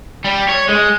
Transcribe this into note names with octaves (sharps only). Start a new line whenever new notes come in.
G3
C#5
G#3